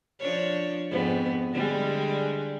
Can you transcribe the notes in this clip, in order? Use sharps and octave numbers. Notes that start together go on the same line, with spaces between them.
F3 D4 C#5
F2 G#2 B3
D3 G3 G#3